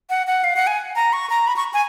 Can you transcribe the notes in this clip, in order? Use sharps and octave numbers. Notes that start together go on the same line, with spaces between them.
F#5
F#5
F5
F#5
G#5
A#5
C#6
A#5
B5
C#6
G#5